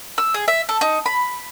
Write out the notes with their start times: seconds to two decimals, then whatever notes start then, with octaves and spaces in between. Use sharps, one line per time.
0.18 E6
0.34 G#4
0.48 E5
0.69 A4
0.81 D#4
1.06 B5